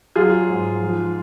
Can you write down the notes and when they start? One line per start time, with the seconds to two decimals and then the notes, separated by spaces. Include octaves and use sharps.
0.15 F#3 F4 G#4
0.49 G#2
0.81 F3